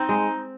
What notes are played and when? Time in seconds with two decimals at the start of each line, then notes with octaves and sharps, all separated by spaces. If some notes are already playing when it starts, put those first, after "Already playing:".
Already playing: C4 D#4
0.09 G#3